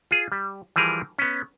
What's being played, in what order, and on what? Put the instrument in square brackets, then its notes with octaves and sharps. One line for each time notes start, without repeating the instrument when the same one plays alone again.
[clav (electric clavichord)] F4 G#4
G3
E3 F3 G3 G#4 A#4
B3 C#4